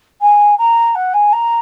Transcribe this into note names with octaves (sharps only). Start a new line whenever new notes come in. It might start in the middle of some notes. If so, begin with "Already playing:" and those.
G#5
A#5
F#5
G#5
A#5